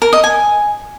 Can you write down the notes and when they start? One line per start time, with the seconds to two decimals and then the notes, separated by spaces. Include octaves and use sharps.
0.02 A#4
0.13 D#5
0.24 G#5